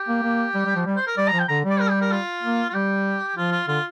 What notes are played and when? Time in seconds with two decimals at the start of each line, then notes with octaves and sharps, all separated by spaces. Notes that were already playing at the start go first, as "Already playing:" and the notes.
Already playing: G4
0.08 A#3
0.23 A#3
0.55 G3
0.66 G3
0.76 F3
0.86 G3
0.96 C5
1.07 A#4
1.17 G3 D5
1.28 A#5
1.33 F3
1.39 G5
1.48 D3 A#5
1.65 G3 D5
1.80 A#4
1.90 G4
2.02 A#4
2.12 F4
2.43 A#3
2.69 F4
2.74 G3 G4
3.36 F3 F4
3.52 F4
3.68 D3 F4